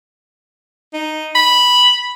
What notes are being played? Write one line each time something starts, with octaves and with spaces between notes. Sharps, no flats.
D#4
B5